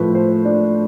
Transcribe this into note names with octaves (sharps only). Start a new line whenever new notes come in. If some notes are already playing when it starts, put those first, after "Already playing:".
Already playing: A2 F3 A3 B4
C5
D4 D5